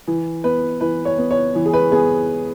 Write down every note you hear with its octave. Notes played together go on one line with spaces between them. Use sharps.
E3
B3 B4
E3 B4
C#5
B3
C#5
E3
G#4
B4
B3 G#4